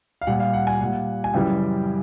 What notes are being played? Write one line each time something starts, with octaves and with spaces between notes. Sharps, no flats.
F5
A#2 G3 F#5
F5
F#5
G#5
A#2 G3 F#5
G#5
F#2 C#3 E3 G3 G5